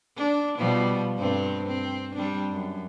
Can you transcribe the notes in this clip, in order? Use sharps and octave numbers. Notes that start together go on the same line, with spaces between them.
D4
B2 F3 G3
G2 A3 C4
C4
G3 C4 D4
F#2